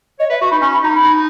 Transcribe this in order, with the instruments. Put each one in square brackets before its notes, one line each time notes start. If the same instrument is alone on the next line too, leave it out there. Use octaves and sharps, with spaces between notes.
[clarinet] C#5 [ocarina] D#5
[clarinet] B4 [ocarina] E5
[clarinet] F#4 [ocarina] C#6
[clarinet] D#4 [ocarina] B5
[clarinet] C#4 [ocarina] C#6
[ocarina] B5
[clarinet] D#4 [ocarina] A#5
[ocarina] B5
[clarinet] D#4